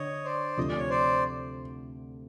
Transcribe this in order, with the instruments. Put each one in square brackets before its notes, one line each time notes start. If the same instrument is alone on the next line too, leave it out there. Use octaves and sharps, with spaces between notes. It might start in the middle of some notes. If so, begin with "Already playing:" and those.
Already playing: [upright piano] D3 [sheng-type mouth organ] C#5 D#5
[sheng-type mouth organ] C5 D5
[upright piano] D2 C3 F3 [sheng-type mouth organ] D#5
[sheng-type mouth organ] D5
C#5
C5 D5